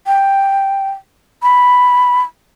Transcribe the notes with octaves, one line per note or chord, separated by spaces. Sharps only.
G5
B5